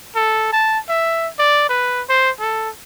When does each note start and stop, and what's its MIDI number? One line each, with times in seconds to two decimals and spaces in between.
0.16 0.51 69
0.53 0.79 81
0.89 1.28 76
1.39 1.67 74
1.69 2.02 71
2.09 2.30 72
2.40 2.70 69